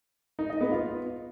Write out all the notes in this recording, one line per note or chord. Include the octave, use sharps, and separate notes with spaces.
D#4
D#5
B3
F4